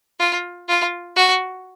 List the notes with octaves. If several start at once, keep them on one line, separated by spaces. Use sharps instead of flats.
F4
F4
F#4